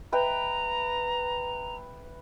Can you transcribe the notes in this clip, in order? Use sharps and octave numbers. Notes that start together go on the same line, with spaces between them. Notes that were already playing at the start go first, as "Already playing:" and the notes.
B4 E5 G5 A#5